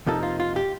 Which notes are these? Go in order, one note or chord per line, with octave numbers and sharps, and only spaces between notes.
F2 C3 F3 A#3 D#4 A4
F4
F4
G4